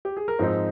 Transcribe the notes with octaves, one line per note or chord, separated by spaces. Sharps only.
G4
G#4
A#4
G#2 F3 C4 D#4 C5